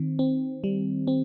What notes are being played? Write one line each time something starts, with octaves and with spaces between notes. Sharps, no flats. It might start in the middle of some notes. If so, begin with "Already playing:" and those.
Already playing: D#3 C4
C4
G3
C4